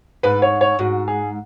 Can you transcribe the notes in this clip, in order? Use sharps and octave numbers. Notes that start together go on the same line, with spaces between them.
G#2 B4
C#5
C#5
G#2 F#4
G#4